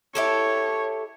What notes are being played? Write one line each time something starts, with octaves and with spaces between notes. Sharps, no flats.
E4 G4 A4 C#5